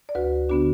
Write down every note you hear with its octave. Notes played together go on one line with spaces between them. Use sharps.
D5
D2 F#4 B4
D3 B3 D4 F#4